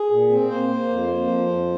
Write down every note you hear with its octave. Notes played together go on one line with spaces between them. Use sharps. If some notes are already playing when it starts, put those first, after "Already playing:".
Already playing: G#4
A#2
C4
A#3 C5
A#3
F2
A#3
F3
F2